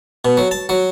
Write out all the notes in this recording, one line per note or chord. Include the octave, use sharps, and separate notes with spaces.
B2
F#3
A5
F#3